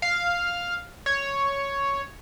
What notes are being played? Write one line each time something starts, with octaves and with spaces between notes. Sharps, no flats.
F5
C#5